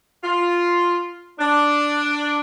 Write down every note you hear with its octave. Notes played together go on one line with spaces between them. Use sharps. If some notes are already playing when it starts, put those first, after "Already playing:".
F4
D4